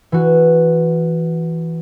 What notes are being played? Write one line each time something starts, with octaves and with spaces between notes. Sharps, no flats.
E3 F#4